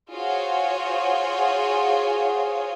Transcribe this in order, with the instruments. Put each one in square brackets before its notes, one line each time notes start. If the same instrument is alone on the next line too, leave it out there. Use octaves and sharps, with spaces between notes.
[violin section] F4 F#4 G#4 C5 C#5